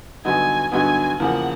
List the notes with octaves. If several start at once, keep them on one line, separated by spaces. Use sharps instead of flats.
G2 D3 F#3 B3 D#4 G#5
G2 D3 F#3 B3 D#4 G#5
E2 C#3 F3 A#3 F#5